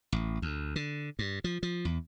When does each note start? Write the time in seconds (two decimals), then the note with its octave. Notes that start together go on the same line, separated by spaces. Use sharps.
0.12 A1
0.42 D2
0.76 D3
1.19 G2
1.44 F3
1.63 F3
1.85 E2